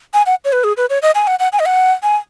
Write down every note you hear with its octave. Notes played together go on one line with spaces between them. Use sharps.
G#5
F#5
C#5
B4
G#4
B4
C#5
D#5
G#5
F#5
F#5
G#5
D#5
F#5
G#5